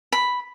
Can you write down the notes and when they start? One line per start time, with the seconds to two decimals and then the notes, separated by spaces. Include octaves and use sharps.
0.12 B5